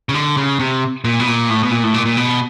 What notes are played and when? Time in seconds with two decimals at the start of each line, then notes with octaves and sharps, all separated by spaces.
0.09 C#3
0.14 D3
0.37 C#3
0.60 C3
1.04 A#2
1.20 B2
1.27 A#2
1.50 A2
1.63 B2
1.71 A#2
1.83 A2
1.94 A#2
2.06 A#2
2.17 B2